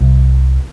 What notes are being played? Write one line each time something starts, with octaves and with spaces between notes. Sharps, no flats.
C2